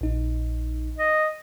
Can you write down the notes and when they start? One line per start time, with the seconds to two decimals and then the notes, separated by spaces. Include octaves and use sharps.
0.01 A#1 D#4
0.98 D#5